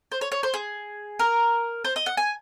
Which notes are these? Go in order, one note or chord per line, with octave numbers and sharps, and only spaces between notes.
C5
C#5
C#5
C5
G#4
A#4
C5
D#5
F#5
G#5